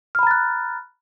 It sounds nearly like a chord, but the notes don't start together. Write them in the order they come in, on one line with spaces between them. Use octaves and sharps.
F6 B5 A#5 A6 F#6